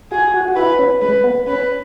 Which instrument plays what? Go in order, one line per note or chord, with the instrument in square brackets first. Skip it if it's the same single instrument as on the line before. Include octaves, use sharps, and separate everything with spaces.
[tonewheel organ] F#4 [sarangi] G#4
[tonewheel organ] F#4
F#4
[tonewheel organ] E4 [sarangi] B4
[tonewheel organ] C#4
[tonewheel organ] G#3 [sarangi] B4
[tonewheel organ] B3
[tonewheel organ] C#4 [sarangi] B4